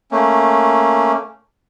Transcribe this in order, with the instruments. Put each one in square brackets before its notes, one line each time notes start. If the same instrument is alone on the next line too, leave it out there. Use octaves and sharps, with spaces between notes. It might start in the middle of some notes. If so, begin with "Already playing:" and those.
[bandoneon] A3 A#3 C#4